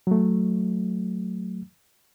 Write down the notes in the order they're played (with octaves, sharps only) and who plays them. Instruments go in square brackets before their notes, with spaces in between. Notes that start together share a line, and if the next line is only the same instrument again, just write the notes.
[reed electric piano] F#3 A3